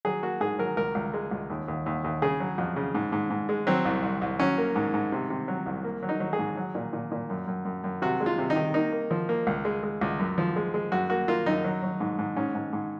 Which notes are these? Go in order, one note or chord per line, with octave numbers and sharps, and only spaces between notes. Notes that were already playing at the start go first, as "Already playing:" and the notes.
F#3 G#4
A#3 F#4
G#2 G#4
F#3 A#4
C#2 A#4
C#2
G#3
C#2
D#2
D#2
D#2
D#2
C#3 G#4
F#3
F2
C#3
G#2
G#2
G#2
G#3
F#3 C4
C2
C2
C2
F#3 C#4
A#3
G#2
G#2
C3
C3
F#3
C2
A#3
F#3
D#4
F#3
G#4
G#2
F#3
A#2
A#2
A#2
F#2
F#2
F#2
F#2
C3 F#4
G#3
F4
C3
D#4
D#3
A#3 D#4
A#3
F3
A#3
C#2
G#3
G#3
C#2
F#2
F3
G#3
G#3
F#2 F#4
A#3 F#4
A#3 F4
F#2 D#4
F#3
F#3
G#2
G#2
G#2 C#4
G#2
G#2